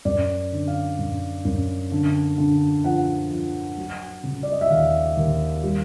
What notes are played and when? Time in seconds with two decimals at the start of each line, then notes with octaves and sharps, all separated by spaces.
0.05 F#2 D5
0.52 D3
0.68 F5
0.99 F#2
1.45 F#2
1.92 D3
2.38 D3
2.84 F3 F#5
3.31 F3
3.78 F#3
4.23 C#3
4.43 D5
4.52 D#5
4.61 E5
4.70 D#2 F5
5.17 D#2
5.63 G3